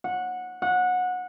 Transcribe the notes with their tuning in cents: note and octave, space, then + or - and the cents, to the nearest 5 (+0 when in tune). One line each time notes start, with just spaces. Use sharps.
F#5 -15
F#5 -20